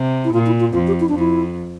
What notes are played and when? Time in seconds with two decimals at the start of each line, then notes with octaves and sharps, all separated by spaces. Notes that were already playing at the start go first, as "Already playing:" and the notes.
Already playing: C3
0.25 E4
0.34 A#2 F4
0.46 E4
0.60 F4
0.73 F2 F4
0.87 G4
1.00 E4
1.09 D4
1.14 F2
1.19 E4